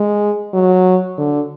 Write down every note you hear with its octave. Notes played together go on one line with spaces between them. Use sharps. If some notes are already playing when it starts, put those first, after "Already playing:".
Already playing: G#3
F#3
D3